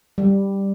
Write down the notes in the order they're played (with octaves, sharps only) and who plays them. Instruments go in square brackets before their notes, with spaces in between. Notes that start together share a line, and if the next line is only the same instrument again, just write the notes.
[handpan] G3